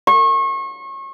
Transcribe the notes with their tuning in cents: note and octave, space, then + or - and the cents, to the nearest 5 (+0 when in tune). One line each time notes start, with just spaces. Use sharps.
C#6 -35